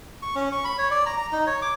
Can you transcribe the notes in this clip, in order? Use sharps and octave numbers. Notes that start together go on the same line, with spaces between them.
C#6
C#4
C#6
B5
C#5
D5
A#5
A#5
D#4
C#5
D6